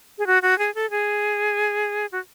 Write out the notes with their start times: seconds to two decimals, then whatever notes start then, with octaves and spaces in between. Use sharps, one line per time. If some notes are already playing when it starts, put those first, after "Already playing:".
0.18 G#4
0.27 F#4
0.42 F#4
0.58 G#4
0.75 A4
0.90 G#4
2.12 F#4